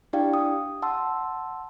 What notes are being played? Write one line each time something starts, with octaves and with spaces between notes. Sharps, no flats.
D4 E4 G4 D5 F5 G5
D#6
F#5 A5 C6 E6